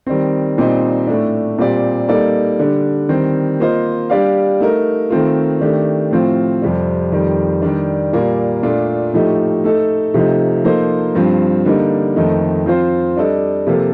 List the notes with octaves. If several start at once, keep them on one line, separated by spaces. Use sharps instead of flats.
D#3 G3 C4
A#2 G3 C4 D#4
A2 A3 D4
A#2 G3 C4 G4 D5
G3 A#3 D#4 A4 D5
D3 G3 D4
D#3 G3 C4
A#3 F4 C5 D#5
G3 D4 G4 D5 F5
A3 D#4 A#4
D#3 A3 C4 F4
D#3 A3 D4 G4
A2 F3 C4 F4
F2 C3 G3
F2 D#3 G3
D#3 G3 D4
A#2 G3 A#3
A#2 A3 D4 F4
A2 F3 A3 D#4 G4
A3 D#4 A4
C3 F3 A3 D#4
F3 A#3 D#4 A4 C5
G2 F3 C4
D3 G3 A#3 D#4
F2 D#3 A3 D#4
F3 C4 F4 C5
G3 D4 A4 D#5
C3 F3 A#3 F4 A4